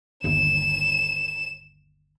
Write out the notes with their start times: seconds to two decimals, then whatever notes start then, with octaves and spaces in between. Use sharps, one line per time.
0.24 G1 D#2 E7